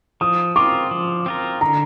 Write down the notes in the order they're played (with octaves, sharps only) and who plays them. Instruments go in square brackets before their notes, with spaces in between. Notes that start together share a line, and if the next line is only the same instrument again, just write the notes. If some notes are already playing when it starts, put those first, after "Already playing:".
[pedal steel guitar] F3 [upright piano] D#6
[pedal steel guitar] C4 F4 A#4 [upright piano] D6
[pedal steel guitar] F3
C4 F4 A#4
[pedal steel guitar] D3 [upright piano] A#5